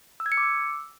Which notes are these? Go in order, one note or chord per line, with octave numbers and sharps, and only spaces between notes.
E6
G#6
C#7
D6
E6